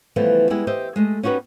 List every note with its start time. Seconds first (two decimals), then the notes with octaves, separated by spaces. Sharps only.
0.16 C#3 E3 F3 G3 A3 B3
0.50 G3 G#3 B3 E4 G4 G#4
0.67 G4 C5 D#5 E5
0.96 G#3 A3 D#5
1.23 C#4 D#4 F#4 G4 B4